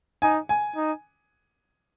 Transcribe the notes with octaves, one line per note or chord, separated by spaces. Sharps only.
D#4 G#5
G#5
D#4